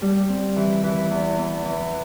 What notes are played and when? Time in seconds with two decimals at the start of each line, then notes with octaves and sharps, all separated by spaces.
0.02 G3
0.29 C4
0.56 E3
0.83 E3
1.11 E2
1.38 E2
1.65 E3